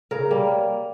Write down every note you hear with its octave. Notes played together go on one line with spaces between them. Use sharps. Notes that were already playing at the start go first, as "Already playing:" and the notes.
C#3 A#4
G3 A#3